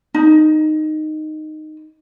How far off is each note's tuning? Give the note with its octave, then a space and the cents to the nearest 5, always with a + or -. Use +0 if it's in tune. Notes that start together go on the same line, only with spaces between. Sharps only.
D#4 -10